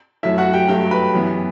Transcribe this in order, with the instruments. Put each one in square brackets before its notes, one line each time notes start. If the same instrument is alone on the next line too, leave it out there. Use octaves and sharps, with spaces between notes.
[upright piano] F#2 F#3 A3 E4 E5
F#4 F#5
G4 G5
G2 F#3 A3 G4 G5
B4 B5
F#2 E3 B3